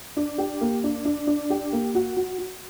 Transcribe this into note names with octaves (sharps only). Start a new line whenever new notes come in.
D4
G4
A#3
D4
D4
D4
G4
A#3
F#4
F#4
F#4